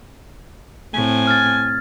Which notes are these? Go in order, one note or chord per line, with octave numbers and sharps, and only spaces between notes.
A2 C4 G#5
F6 G#6 A6